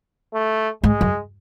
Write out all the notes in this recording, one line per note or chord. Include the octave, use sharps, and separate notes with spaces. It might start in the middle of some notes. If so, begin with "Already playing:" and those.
A3
G#2 G#3
F#2